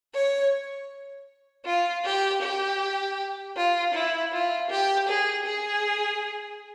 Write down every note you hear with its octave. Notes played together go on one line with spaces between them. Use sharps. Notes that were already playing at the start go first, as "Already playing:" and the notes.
C#5
F4
G4
G4
F4
E4
F4
G4
G#4
G#4